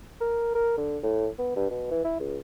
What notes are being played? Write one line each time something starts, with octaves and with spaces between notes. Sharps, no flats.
A#4
A#4
D3
A2
B3
G2
B2
E3
E4
C#2